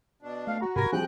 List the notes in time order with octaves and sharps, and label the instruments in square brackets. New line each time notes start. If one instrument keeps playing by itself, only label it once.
[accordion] B2 D4
[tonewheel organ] A3 [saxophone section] F5
[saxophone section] F#4 [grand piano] A#5
[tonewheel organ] G#2 C3 G4 [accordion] A#4 G#5 [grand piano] B5 A#6
[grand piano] F3 G3 C4 [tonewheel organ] G#4 G#5 [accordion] G5 F#6